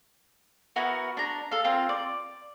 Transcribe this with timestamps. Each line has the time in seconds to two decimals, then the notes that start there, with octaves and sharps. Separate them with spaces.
0.76 B3 E4 F#4 A#4
1.17 D4 A#5
1.51 A4 F5
1.64 C4 F4 A#4
1.89 D5